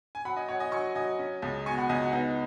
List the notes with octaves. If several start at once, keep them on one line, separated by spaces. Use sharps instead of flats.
G#5
F#3 F#5 B5
D#5 G#5
F#3 C#5 F#5
D#5 G#5
F#3 G#5 C#6
F#3 D#5 G#5
C#4
C#2
B2 G#5 C#6
F#5 B5
C#2 D#5 G#5
F#4
B3 D#4